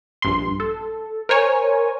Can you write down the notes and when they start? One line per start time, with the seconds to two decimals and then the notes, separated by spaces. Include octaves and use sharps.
0.22 A#1 G2 C6
0.60 A4
1.29 A#4 C5 C#5 G#5